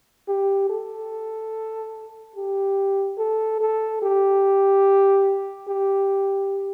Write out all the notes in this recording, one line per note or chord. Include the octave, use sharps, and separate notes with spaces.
G4
A4
G4
A4
A4
G4
G4